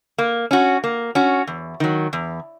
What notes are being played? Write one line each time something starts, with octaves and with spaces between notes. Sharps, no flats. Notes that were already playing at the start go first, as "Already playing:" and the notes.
A#3
C#4 F#4
A#3
C#4 F#4
E2
D#3 F#3
E2